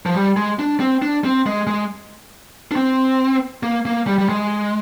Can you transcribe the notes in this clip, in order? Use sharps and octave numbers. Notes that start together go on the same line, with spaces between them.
F3
G3
G#3
D4
C4
D4
C4
G#3
G#3
D4
C4
A#3
A#3
G3
G3
G#3